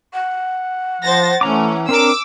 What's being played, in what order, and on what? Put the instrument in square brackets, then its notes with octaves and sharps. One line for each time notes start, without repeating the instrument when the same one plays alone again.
[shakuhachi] F#5
[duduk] F3 [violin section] C5 A6 A#6
[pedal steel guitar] E3 A#5 D6 [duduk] A3 [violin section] C#4
[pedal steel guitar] C4 D4 A#5 [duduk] A#4 [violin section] D6 E6